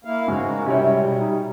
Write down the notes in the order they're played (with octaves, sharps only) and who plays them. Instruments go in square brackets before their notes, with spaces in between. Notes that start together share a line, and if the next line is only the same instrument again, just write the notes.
[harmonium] A#3 E4 F5
[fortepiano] G#2 C#3 C#4 [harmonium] G#3 F#4
[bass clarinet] A#4
[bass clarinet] C3 [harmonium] G3 [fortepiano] C#4 E4 C#5
[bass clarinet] B2
D#4